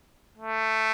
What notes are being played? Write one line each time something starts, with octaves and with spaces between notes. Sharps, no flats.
A3